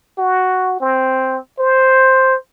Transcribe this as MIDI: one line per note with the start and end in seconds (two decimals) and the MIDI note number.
0.18 0.79 66
0.80 1.37 60
1.59 2.35 72